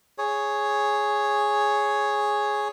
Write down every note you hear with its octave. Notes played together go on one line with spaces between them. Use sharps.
G#4 C#5